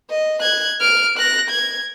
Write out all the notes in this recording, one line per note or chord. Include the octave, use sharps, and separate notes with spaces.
D#5
F#6 G#6
F6 D7
F#6 A#6
G#6